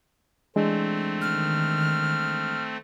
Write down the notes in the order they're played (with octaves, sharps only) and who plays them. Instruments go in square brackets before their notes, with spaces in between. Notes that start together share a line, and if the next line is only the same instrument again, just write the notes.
[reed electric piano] E3 G#3 D4 [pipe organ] A3 C4
[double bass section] D#3 [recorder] F6